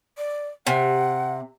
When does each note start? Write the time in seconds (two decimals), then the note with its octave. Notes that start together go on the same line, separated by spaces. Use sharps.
0.18 D5
0.67 C3 F#5